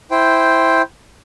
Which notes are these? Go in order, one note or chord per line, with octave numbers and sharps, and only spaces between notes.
E4 C5 G5